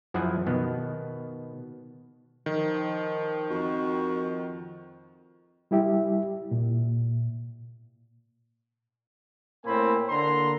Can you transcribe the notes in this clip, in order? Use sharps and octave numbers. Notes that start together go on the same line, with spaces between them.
F#2 F3 E4 G#4 E5 F#5
B2 D#3 B3
D#3 F3
F2 F#4
G3 E4 G4 E5
A#2
A2 A#3 C4 G#5 B5
D3 A#3 A#5 C6